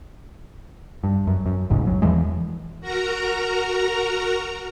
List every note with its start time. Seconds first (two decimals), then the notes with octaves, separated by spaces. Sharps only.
1.04 G2
1.27 F#2
1.46 F#2
1.70 E1 A1 G#2 C#3
1.87 F#3
2.02 E2 E3 F3 G#3
2.81 F#4 A#4 A#5